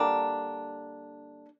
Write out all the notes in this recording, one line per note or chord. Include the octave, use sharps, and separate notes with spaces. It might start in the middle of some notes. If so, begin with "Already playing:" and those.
Already playing: D3 G3 A#3 D4